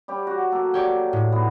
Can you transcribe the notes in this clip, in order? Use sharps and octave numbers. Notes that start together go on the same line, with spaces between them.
G3 G4 C#5
F#4
F#3 A#3 A4
G4 C#5 D5
A2
D#3 F3 B3